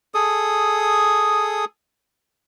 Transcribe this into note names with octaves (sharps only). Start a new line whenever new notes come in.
G#4 A4 D#6